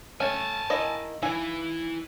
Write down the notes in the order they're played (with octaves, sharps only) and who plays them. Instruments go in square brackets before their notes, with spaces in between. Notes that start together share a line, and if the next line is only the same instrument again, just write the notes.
[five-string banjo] A3 C#4 [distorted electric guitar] G#5 A5
[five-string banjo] D#3 E4 D#5 [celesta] F5 A#6
[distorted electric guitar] E3 [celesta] D#4 F5 E6 [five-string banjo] G#5